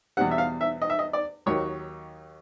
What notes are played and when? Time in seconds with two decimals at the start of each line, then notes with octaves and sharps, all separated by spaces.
0.17 E2 B2 G3 F#5
0.31 E5
0.38 F5
0.61 E5
0.82 D#5
0.90 E5
0.99 D#5
1.13 D5
1.46 D#2 D#3 F#3 C#5